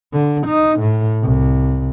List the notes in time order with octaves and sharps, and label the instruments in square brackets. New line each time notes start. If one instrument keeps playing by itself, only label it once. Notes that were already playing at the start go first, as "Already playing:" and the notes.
[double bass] D3
D#4
A2
C2